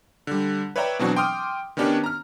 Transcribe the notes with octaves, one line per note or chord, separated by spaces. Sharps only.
D3 G3
B4 C#5 D5 E5 G5 A#5
B2 E3 F#3 C4 D4 F#4
G5 C6 D6 D#6 F6
D#3 B3 C#4 D4 G4 C#5
A#5 F6